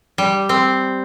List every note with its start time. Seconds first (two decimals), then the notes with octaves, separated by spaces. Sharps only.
0.18 G3
0.49 C4